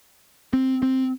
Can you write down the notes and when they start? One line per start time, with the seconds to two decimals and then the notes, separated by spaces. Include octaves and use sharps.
0.53 C4
0.82 C4